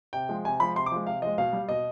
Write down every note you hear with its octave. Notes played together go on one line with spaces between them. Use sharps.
C3 G5
F3 G#3
C3 G#5
F3 G#3 B5
C3 C6
D6
F3 G#3
C3 F5
F3 G#3 D#5
B2 F5
G3
B2 D#5